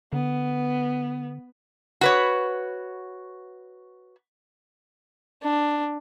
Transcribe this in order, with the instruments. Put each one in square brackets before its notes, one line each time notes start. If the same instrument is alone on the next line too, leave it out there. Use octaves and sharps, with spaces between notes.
[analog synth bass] D3 [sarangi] B3
[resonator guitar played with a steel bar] F#4 B4 C#5
[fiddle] D4